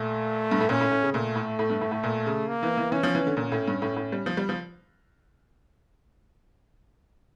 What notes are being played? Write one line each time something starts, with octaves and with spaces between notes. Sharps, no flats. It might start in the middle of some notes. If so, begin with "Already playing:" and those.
Already playing: A#2 A3
G2
A2
A#2 C#4
A2
A2
C#3
A#2 A3
A2
A2
G2
A2
A2
A#2
C#3
A#3
E3
E3
E3 C#4
F3
E3
D3
A#2 C#4
A2
G2
A2
A2
G3
F3
G3
F3